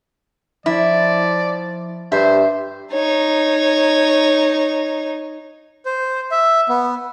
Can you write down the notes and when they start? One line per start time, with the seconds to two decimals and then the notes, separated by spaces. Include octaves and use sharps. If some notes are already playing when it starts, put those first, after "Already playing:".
0.66 F3 E4 D5
2.12 G2 C5 E5
2.93 D#4 C#5
5.86 C5
6.31 E5
6.69 B3